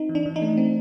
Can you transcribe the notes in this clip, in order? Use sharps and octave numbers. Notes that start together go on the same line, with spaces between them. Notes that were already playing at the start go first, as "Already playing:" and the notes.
Already playing: C4 D#4
E3
D4
E3
D#4
A3
C4